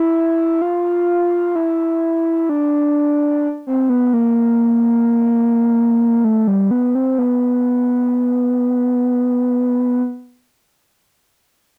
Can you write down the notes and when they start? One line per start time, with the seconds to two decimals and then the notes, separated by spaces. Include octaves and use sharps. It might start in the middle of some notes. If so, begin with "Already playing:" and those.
Already playing: E4
0.62 F4
1.56 E4
2.49 D4
3.67 C4
3.90 B3
4.13 A#3
6.24 A3
6.48 G3
6.71 B3
6.95 C4
7.18 B3